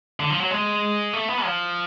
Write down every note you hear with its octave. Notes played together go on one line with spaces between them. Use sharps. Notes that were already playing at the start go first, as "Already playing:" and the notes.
D3
F3
F#3
G#3
A3
B3
F3